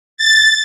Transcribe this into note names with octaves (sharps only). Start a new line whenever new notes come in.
A6